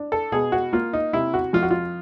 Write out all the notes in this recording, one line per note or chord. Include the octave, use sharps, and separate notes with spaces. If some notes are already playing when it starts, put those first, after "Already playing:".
Already playing: D4
A4
B2 G#4
F#4
A#3 F4
D#4
C3 E4
F#4
F2 F4
F#4
F4